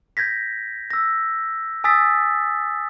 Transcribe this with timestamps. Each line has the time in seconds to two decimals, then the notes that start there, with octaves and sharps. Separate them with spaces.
0.17 G6 G#6 A#6 B6
0.91 E6 A#6
1.84 G#5 D#6 E6 A6 B6